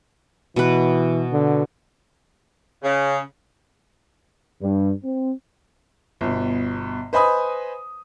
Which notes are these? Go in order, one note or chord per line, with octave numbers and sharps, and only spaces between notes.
B2 E3 B4
D3
C#3
G2
C4
G1 B2
B4 C5 D#5 G#5 B5 D#6